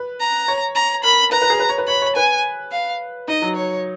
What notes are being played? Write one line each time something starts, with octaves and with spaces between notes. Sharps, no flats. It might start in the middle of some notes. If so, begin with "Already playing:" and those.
Already playing: B4
A#5
C#5
A#5
A#4 B5
B4 A#5
B4
G#4
B4
C#5
B4
C#5 B5
C#5
B4 G#5
F5
D#4 D#5
F#3
C#5